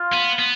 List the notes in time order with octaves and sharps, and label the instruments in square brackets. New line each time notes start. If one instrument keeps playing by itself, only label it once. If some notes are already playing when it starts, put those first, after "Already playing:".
Already playing: [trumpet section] F4
[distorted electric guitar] B3
B3